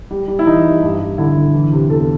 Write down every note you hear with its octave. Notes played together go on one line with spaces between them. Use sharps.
G3
G3
E4
E3 D#4
G3
G2
G2
D3 E4
D3
E3
C3
E2 A4